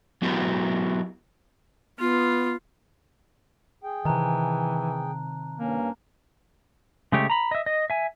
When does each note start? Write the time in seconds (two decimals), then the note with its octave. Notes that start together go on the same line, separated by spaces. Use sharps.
0.22 F#3 B3 E4 F#4 G4 A#4
1.99 B3 F4
3.84 G#4 G5
4.05 C3 D#3 E3 A5 A#5 F#6
5.60 G2 A#3 C#4
7.12 C#3 G#3 A3 G4 C#5
7.30 A#5 B5
7.51 D#5 E5
7.66 D#5
7.90 E5 G#5